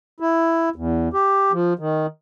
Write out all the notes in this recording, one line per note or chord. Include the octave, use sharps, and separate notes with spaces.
E4
E2
G4
F3
D#3